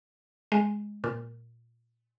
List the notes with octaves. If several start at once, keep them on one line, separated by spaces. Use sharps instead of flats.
G#3
A#2